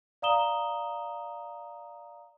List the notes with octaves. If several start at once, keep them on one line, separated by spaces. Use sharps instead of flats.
D5 F5 A#5 D#6 E7 G7